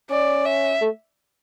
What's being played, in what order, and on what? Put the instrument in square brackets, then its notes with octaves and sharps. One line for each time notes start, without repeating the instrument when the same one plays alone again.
[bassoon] C#4 [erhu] D5
[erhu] E5
[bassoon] A3